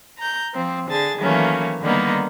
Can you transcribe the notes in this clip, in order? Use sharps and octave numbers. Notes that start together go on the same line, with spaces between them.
A#5 G6
F3 C4
D3 G#4 A5 A6
D#3 E3 F#3 A3 A#3 C#4
D3 D#3 G3 A#3 B3 D#4